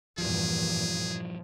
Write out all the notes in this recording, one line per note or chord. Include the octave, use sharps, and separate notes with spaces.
E2 G2 A#2 F3 G3 G#4